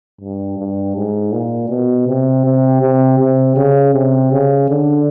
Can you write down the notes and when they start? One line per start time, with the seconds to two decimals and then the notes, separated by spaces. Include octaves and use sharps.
0.21 G2
0.58 G2
0.96 G#2
1.32 A#2
1.70 B2
2.07 C3
2.45 C3
2.82 C3
3.19 C3
3.56 C#3
3.93 C3
4.31 C#3
4.69 D3